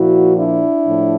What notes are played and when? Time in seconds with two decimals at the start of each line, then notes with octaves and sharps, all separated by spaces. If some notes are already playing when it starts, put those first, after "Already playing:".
Already playing: A#2 F3 E4 F#4
0.38 D4 E4
0.85 A2 F3